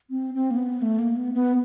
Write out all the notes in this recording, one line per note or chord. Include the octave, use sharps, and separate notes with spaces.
C4
C4
A#3
B3
A3
A#3
B3
B3